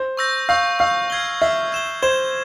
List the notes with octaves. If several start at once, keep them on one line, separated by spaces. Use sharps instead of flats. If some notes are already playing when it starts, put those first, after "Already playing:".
Already playing: C5
C#6 E6 G6 A#6
F5 C#6 E6 G6
F5 C#6 E6 G6
F6 G#6 C7 G7
E5 F6 G#6 C7 G7
G#6 E7 G7
C5 G#6 E7 G7